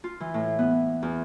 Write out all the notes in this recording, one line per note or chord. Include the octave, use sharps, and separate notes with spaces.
F4
E3
A2
B3
E2